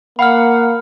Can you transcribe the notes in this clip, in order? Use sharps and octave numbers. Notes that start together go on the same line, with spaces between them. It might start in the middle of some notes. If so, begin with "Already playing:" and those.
A#3 F5 F#5 B5 F6